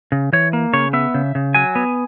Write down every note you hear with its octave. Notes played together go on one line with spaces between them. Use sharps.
C#3
E3 C#5
A#3
C#3 C#5
B3 E5
C#3
C#3
F#3 G#5
B3